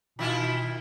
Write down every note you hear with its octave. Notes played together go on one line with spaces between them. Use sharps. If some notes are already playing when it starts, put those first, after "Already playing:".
B2 D#3 E4 F4